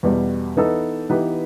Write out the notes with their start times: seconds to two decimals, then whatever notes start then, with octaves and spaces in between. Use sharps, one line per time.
0.03 E2 B2 G3
0.57 E3 B3 D#4 A4
1.09 E3 B3 D#4 G4 B4